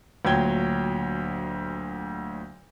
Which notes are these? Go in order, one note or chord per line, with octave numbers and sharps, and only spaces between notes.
D2 A#2 F#3 G5 G#6 G7